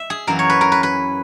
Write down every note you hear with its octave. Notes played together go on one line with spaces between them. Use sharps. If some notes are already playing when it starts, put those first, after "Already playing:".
Already playing: E5
G#4
F#2 E3 A#3 A#4
C#5
B4
A#4
B4
B4